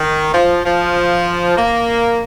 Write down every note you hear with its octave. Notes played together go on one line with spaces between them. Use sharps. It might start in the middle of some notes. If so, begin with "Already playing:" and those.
Already playing: D#3
F3
F3
A#3